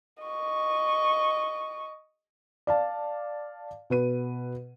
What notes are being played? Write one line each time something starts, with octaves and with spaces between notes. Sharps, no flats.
D#5 C#6
D5 F5 A5
B2 B4 D#7